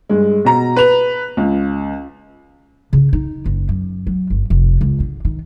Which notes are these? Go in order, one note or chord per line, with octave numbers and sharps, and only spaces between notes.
G2 G#3
B2 A#5
B4 F7
C#2
C#3
D#4
F#1
F#2
F#3
G1
F1
C#2
D3
D#3